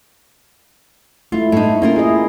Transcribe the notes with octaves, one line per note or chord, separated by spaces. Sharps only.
A3 E4 F4
A2 D#4
A#3 C#4 F4 A#4
E4 G#4 D#5